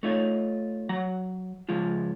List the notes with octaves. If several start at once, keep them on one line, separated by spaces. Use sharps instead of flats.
A3 D#4 F4 C#5
F#3 F#5 A#5
C#2 F3 G#3 F4